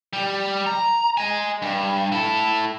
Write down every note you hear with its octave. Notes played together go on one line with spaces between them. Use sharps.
G3
A#5
D#5 G#5
G2
E4 A4